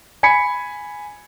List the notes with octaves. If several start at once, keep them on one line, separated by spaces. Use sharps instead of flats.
G#5 B5 G#6 B6 C#7